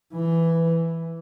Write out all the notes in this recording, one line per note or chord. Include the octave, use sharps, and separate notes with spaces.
E3